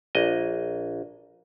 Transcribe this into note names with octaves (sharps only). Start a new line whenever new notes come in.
A#1 D#5